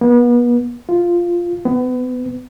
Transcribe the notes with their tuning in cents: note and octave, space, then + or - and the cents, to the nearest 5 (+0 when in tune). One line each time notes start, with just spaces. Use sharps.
B3 -35
F4 -5
B3 +30